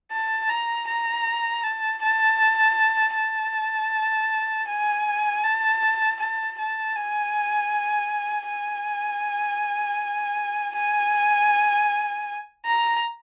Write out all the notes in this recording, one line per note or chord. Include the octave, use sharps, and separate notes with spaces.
A5
A#5
A#5
A5
A5
A5
G#5
A5
A5
A5
G#5
G#5
G#5
A#5